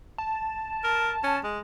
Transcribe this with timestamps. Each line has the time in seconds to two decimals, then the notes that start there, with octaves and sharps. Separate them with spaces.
0.18 A5
0.84 A#4
1.23 C#4
1.44 G#3